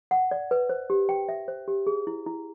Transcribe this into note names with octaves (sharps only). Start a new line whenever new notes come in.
F#5
D5
B4
C5
G4
G5
E5
C5
G4
G#4
E4
E4